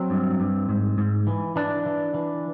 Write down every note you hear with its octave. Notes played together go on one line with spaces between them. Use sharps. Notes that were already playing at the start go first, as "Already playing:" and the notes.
Already playing: F#3 C4
G2
G2
G#2
G#2
E3
E3 D4
E3
E3